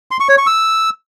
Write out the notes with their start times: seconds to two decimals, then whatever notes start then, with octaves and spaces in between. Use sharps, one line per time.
0.11 C6
0.20 C#6
0.29 C#5
0.38 C#6
0.47 E6